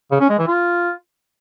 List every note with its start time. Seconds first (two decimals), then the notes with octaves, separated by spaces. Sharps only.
0.11 C#3
0.20 C#4
0.29 G#3
0.38 E3
0.48 F4